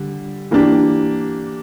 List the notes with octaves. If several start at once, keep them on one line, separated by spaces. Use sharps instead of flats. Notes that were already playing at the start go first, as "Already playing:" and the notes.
Already playing: D3 G3
E3 A#3 D4 G4